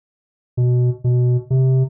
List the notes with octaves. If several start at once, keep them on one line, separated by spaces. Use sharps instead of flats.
B2
B2
C3